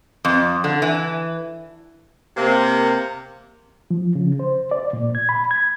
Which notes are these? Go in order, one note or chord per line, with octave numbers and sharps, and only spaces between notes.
F2
D3
E3
C3 A#3
F3
C#3
C5
D5
A#2
G#6
B5
G#6